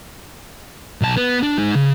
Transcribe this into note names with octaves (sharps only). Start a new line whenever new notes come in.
B1 A5
B3
D4
G#3 D#4
C#3